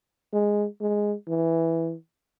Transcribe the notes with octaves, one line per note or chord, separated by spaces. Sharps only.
G#3
G#3
E3